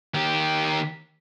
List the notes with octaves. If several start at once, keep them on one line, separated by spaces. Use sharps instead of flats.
D#3 G4